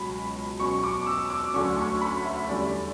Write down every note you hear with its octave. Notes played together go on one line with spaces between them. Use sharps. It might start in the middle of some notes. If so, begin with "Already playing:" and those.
Already playing: C#2 B2 F#3 C#4 B5
B2 F#3 C#4 C#6
C#6
D6
E6
D6
D2 D3 F#3 C#4 C#6
C#6
B5
E5
E2 D3 G3 C#4 D5